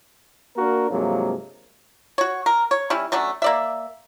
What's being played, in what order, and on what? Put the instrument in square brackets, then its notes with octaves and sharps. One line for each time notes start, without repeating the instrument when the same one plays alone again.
[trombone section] A#3 D4 F#4 A#4
G2 C3 F3 F#3 G#3 A#3
[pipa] F#4 C#5
A#4
C#5
G3 C#4 E4
F#3 A3 C#4 D4
A#3 D5 E5